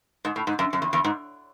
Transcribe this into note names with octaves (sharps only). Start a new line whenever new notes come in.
G#2
A2
G#2
F#2
F#2
E2
E2
G#2